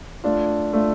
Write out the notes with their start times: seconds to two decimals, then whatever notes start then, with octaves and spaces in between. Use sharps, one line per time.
0.24 A3 D4 F4
0.73 A3 D4 F4